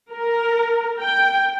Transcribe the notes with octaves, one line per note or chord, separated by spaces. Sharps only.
A#4
G5